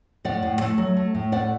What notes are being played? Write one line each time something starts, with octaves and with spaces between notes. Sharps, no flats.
A2 D5 F#5
A2
A3
F#3
A3
A2
A3 D5 F#5